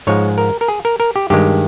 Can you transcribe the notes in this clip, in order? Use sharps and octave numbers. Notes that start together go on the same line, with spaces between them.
G#2 F3 G#3 C#5
A#4
A#4
G#4
A#4
A#4
G4
G2 D#3 G#3 G4